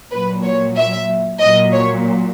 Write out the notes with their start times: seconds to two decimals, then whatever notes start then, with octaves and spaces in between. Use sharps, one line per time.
0.12 A#2 F#3 B4
0.44 C#5
0.77 E5
1.41 A#2 F#3 D#5
1.73 C#5